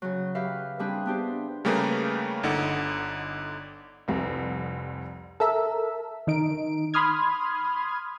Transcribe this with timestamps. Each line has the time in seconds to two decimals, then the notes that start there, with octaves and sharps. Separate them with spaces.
0.02 C#3 F#3
0.35 G4 B4 E5 F5
0.79 G3 C4 D4 G#4 B4
1.06 B3 D4 G4 C5
1.65 C#3 G3 A3 A#3 G#4 B4
2.43 G1 D3 D#4 F#5
4.08 F1 C2 F2
5.40 A4 A#4 E5
6.27 D#3 D#4 D7
6.94 B5 C6 D#6 F6 G#6